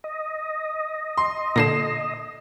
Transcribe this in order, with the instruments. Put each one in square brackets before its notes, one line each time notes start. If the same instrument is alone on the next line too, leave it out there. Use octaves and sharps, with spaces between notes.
[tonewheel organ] D#5
[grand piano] C6
[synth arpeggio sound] A#2 D3 [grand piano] A#6 C7 E7